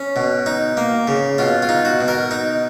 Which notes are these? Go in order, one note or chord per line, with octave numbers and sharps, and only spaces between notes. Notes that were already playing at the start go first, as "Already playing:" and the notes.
Already playing: C#4
B2
D#4
A#3
C#3
B2 F4
F4
D#4
F#4
B2
A#4
D#4